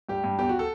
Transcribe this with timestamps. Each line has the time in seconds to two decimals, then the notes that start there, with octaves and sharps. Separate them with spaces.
0.09 G2 G4
0.24 G2
0.39 E2 G4
0.49 F#4
0.59 A4